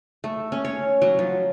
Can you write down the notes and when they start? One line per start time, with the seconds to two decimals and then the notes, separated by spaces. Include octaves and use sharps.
0.24 A3
0.52 C#4
0.65 C#5
1.02 F#3
1.19 F3